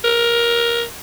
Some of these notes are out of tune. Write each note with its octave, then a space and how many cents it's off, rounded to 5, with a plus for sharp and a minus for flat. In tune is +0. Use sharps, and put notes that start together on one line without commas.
A#4 +15